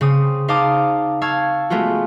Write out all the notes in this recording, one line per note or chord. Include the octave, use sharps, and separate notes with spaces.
C#3 C4 D#6
D#4 C5 F5 A5 D6 D#6
F5 A5 C#6 E6 G#6 A6
G#3 A3 B3 F4 F#4